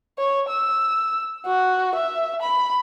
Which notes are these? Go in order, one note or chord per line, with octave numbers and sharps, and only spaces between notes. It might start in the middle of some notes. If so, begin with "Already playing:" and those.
C#5
E6
F#4
E5
B5